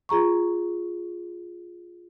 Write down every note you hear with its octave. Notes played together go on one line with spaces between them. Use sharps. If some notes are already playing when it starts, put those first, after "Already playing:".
F4 G#4 A#5 C#6